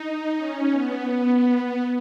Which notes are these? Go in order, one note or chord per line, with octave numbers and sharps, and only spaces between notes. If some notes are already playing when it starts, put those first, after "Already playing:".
Already playing: D#4
C#4
B3
B3